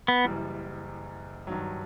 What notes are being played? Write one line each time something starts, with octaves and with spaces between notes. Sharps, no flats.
B3
F#1 F#2 E3 G3
G2 D#3 F#3